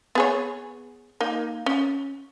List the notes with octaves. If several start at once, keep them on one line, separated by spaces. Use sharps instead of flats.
B3 G#4 C#5
A#3 D#4
C#4